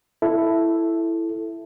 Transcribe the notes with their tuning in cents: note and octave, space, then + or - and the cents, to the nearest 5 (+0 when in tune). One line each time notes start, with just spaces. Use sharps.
E4 +5 A4 +0